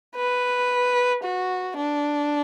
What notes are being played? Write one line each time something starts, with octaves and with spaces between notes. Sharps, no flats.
B4
F#4
D4